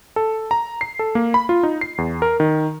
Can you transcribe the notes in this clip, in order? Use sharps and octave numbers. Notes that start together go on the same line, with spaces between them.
A4
A#5
C7
A4
A#3
B5
F4
D#4
C7
E2
A#4
D#3